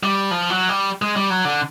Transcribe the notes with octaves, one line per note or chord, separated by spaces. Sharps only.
G3
F3
F#3
G3
G#3
G3
F#3
D3